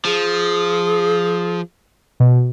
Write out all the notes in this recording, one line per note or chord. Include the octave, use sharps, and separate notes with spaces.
F3 G#4
B2